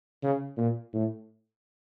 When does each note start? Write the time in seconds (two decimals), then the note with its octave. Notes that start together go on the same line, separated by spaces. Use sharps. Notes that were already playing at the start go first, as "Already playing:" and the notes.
0.23 C#3
0.57 A#2
0.93 A2